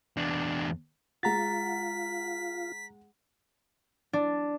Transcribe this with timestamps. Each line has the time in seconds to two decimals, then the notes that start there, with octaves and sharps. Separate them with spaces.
0.17 E2 D4
1.23 G#3 F4 F#5 A#5 A6 B6
4.13 D4